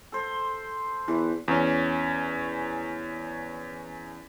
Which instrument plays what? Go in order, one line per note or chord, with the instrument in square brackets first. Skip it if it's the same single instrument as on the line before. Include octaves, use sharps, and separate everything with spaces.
[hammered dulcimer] A4 C5
[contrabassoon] E2 [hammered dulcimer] E3
[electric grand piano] E2 C#4